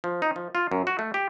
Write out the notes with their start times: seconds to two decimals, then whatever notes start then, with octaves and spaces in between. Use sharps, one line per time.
0.04 F3
0.22 D#4
0.36 F3
0.55 F4
0.72 F#2
0.87 F#4
0.99 A3
1.14 G4